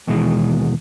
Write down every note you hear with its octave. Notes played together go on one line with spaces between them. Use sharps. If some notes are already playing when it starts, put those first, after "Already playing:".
D#2 B2 E3 G#3